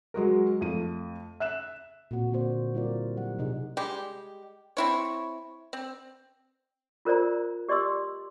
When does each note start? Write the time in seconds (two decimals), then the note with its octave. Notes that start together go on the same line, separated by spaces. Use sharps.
0.14 F#3 G#3 F#4 A#4
0.61 F2 A3 D#7
1.40 E5 F#6 E7
2.11 A#2 C4 F#4
2.31 D3 A#3 C4 F#4 C5 D5
2.74 G3 C4 E4 F4 A#4 D5
3.17 F#3 G4 F#5
3.39 C3 D#4 G#4
3.77 G3 G#3 G4
4.77 C4 E4 C#5
5.73 C4
7.05 F4 A#4 C5 D5 A#5
7.69 G4 D5 D#5 C6 D6 E6